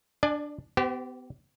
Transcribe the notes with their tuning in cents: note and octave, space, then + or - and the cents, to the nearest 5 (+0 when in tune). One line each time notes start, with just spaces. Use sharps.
D4 +0 D5 +30 G#5 +25
B3 +35 G4 -20 C5 -25